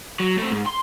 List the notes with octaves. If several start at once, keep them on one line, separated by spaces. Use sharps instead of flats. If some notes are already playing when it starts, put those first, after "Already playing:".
F#3
A3 C4
G#2
C6